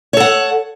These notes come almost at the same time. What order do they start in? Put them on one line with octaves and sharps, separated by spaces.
C#5 A4 F#5